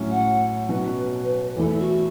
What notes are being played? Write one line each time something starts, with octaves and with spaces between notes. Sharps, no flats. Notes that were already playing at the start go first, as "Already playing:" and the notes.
Already playing: A2 F#3 C#4
F#5
B2 F#3 C#4 F#4 B4
E2 E3 A3 E4 A4
F#4